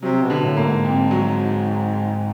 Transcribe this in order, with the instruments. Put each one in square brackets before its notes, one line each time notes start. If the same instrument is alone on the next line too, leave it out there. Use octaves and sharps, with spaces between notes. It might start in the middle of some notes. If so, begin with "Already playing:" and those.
[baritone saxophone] C3 [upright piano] F#3
[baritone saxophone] B2
[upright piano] D3
[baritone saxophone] A2
[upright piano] A#3
[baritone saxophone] G#2
[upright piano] F2
F#3